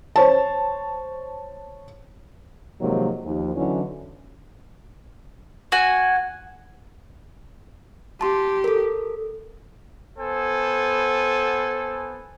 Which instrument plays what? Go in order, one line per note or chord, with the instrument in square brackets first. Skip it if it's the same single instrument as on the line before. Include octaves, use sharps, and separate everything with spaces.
[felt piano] C5 C#5 A5
[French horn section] C3 D#3 F3 F#3 G#3 A#3
D#2 F3
D3 E3 F#3 C#4 D#4 E4
[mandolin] F#4 G#5
[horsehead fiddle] G4 [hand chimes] A5 C6
[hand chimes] A4 A#4
[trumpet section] B3 A4 C5 G#5